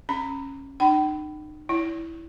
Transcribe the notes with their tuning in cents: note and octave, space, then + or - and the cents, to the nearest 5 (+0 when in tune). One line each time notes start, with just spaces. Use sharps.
C#4 -15 B5 -5
D#4 -40 G5 -40 B5 +15
E4 -5 D5 -45